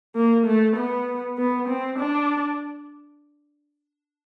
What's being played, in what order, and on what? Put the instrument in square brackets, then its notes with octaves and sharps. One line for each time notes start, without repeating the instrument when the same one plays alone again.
[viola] A#3
A3
B3
B3
C4
D4